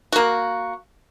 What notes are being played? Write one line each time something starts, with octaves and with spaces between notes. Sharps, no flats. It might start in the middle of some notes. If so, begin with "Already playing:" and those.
A#3 F#4